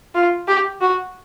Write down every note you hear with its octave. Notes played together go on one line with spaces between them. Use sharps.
F4
G4
F#4